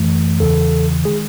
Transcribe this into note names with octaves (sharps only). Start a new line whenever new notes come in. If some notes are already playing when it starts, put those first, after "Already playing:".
Already playing: F#2 E3 A3
E2 C#3 E3 A4
D#3 G#3 G#4